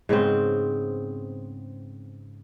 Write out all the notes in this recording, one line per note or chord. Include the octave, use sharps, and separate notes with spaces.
G#2 C#3 B3 C4